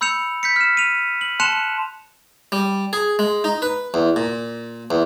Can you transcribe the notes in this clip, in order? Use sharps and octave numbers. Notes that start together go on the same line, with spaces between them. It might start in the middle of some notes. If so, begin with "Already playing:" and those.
B5 E6 G6 C#7 F7
G6 B6 C#7
F6 E7
D#7 F7
F#7
A5 C6 F#6 C#7 E7 F7
G3
G#4
G#3
D#4
B4
E2
A#2
E2